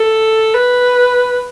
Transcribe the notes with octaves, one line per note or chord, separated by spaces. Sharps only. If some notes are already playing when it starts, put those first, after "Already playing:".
Already playing: A4
B4